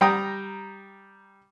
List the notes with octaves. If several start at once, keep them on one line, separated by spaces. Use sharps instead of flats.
G3 G5 A#5 D#6